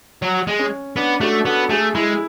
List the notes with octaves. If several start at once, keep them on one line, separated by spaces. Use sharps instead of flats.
F#3
G#3
C#4
B3 D4
A3 F#4
B3 A4
A3 G#4
G#3 E4